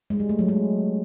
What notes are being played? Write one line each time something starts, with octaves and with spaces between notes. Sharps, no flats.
G#3
G3
A3
F#3
G#3